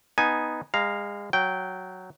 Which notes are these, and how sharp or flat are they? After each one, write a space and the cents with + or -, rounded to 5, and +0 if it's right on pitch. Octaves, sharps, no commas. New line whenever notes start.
B3 +0 D#4 +0 G#5 +0
G#3 -30 F5 +0 A#5 +0
F#3 +0 G5 -15